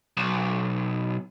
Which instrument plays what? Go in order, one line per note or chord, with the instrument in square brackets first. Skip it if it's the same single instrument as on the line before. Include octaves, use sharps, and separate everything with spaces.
[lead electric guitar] B1